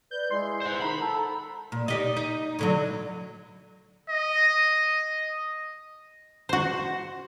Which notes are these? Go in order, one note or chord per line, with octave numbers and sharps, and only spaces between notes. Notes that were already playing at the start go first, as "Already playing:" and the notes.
B4 D5 G6
G#3 E4 C6
C5 F#5
D#3 F#5 A#5 B5
A4
A#2
D#4 G4 D5
D#4
A2 D3 F#3
D#5
F#4 C5